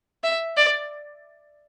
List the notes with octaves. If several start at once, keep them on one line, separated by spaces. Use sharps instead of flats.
E5
D5